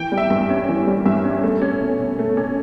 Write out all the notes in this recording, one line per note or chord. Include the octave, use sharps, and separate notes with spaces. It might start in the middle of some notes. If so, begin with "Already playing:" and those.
Already playing: E3 G5
G3
E5
G2 E5
C#4
E3
G3
G2 E5
C#4
A3
C#4
B2
B2
A3
C#4